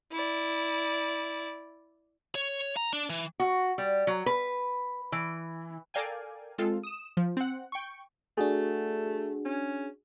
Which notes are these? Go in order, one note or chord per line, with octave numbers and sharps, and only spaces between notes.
E4 D5
C#5
A#5
D4
E3
F#4
G3
F#3
B4
E3
A4 A#4 D5 F5 G5 G#5
G#3 C4 F4 A4
D#6 E7
F3
C4 F#5
G5 C#6
A3 D4 F#4 G#4
C#4